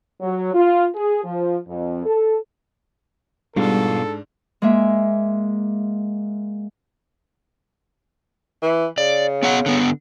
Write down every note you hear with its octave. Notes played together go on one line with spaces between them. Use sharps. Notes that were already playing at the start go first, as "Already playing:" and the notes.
F#3
F4
G#4
F3
F2
A4
G#2 B2 G3 B3 D4 F4 A4
G#3 A#3 E5
E3
C#3 D5
B3 C#5 F#5
D3 B3